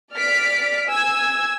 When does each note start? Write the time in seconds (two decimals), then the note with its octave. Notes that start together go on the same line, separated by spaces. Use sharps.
0.14 D5 F6 B6 D7
0.88 G#5 E6 G#6